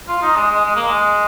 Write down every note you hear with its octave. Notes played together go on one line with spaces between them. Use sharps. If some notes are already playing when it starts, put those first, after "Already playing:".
F4
D#4
G#3
G#3
G#3
A#3
G#3